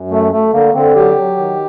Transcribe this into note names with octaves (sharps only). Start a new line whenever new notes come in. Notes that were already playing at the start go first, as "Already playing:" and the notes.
Already playing: F#2
A3
A3
D3 A#3
D3 C4
F#3 G4
F#3
D#3